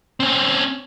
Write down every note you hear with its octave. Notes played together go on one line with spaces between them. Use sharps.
C4 C#4